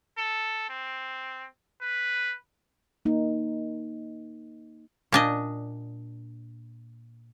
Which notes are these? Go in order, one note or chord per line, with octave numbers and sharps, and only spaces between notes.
A4
C4
B4
A#3 D#4
A#2 D4 D#5